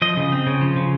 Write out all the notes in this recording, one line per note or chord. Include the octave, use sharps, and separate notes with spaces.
F3 D#5
C#3
C4
C#3
F3
C#3